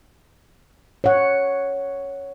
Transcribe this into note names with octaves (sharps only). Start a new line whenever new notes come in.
C#5 F#5